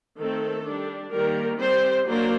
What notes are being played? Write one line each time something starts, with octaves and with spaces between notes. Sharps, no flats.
D#3 A3 C4 A4
G3 D4
D#3 G3 A#3 A#4
G3 C4 C5
F#3 A#3 D4 C5